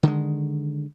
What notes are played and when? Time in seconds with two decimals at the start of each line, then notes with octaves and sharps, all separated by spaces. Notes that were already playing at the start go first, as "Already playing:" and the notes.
0.03 D3 D#3 G3 G#3